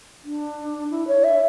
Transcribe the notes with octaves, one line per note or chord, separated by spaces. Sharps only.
D4
E4
C#5
E5